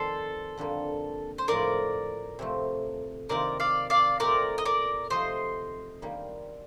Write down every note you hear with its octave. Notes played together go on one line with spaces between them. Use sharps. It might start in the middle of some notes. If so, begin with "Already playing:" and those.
Already playing: F2 D#3 G3 A4 C5
F2 D3 G3 A#3
C5
A2 F3 A#3 A#4 D5
C3 F3 A3
C3 D#3 A#3 F4 A#4 D5
D5 F5
D5 F5
A#2 A3 C4 G4 A#4 D5
D#5
A#4 D5
C3 F3 A3 D#4 G4 C5 D#5
D#3 G3 A#3 D#4